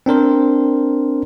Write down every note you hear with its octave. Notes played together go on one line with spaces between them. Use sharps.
C4 D4 A#4 C5